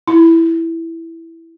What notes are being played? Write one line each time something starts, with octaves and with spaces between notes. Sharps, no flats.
E4